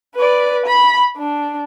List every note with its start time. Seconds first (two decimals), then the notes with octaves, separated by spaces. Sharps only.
0.15 B4 D5
0.67 B5
1.17 D4